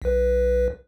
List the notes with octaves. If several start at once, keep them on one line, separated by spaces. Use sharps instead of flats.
B1 B4